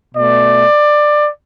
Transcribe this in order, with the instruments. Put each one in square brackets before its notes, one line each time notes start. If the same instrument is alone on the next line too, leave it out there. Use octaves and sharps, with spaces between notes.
[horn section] B2 A3 D5